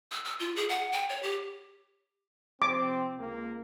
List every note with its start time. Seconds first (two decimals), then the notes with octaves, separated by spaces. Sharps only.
0.12 E6
0.25 E6
0.40 F4
0.56 G#4
0.69 F#5
0.92 G5
1.09 C#5
1.23 G4
2.62 C3 F3 C4 D6
3.19 C#2 A#3